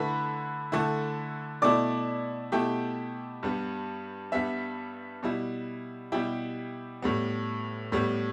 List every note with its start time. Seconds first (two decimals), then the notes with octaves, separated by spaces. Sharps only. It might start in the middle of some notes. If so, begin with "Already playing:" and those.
Already playing: D3 A3 E4 B4 B5
0.72 D3 A3 E4
1.62 B2 A3 E4 D5 D6
2.52 B2 A3 E4 G4 G5
3.43 G2 G3 B3
4.32 G2 G3 B3 E5
5.23 B2 G3 E4
6.12 B2 G3 E4 G4 G5
7.02 A2 G3 B3
7.92 A2 G3 B3